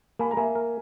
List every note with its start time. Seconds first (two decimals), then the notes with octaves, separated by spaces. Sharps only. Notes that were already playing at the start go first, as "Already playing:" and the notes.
0.19 A#3 G#5 B5
0.31 A#5
0.37 A#3 E5 G#5
0.55 A#4